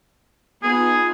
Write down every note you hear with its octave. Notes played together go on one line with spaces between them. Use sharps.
B3 D#4 F4 G#4